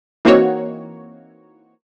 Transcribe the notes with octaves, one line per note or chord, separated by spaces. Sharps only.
E3 A#3 C4 D#4 F#4 C#5